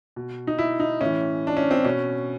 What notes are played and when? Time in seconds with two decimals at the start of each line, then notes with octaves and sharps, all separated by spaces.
0.16 B2
0.47 D#4
0.59 E4
0.80 D#4
1.01 A2 E3 C#4
1.47 D4
1.57 C#4
1.71 C4
1.85 B2 C#4